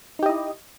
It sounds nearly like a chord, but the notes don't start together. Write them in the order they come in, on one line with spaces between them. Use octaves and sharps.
D#4 G4 D#5 E4